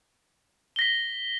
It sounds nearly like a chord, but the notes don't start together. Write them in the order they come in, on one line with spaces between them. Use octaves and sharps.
G7 A#6 B6